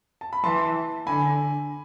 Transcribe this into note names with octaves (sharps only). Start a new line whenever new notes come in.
A5
B5
E3 A5 C6
D3 G#5 B5